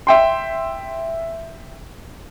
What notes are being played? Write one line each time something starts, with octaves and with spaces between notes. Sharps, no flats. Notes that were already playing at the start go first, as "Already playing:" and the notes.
E5 G5 C6